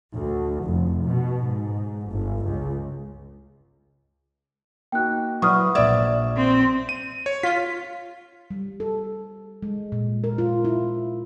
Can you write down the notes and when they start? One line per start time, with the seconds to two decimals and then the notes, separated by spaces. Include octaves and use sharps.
0.14 D2
0.63 F1
1.06 B2
1.46 G#2
2.09 G1
2.44 C#2
4.92 A#3 D#4 F#4 G5 F#6
5.42 F#3 E4 B4 D5 C#6 D#6 F6
5.75 A#1 D5 E5 D6 G#6
6.37 C4
6.89 D#7
7.26 C#5
7.43 F4 B6
8.51 G3
8.80 A4
9.63 G#3
9.92 A#2
10.24 A#4
10.38 F4
10.65 E4